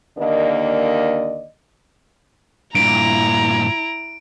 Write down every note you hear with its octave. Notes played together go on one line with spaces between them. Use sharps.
D#2 D3 A#3 D5 D#5
G2 A#2 E4 A#5 D7